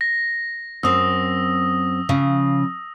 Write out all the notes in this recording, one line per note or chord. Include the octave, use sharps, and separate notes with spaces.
A#6
F#2 C4 D#6 E6
C#3 F3